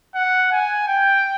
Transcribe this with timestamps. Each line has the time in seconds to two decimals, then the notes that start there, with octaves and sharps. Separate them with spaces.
0.15 F#5
0.52 G#5
0.88 G5